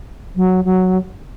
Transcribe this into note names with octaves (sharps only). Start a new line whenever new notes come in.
F#3
F#3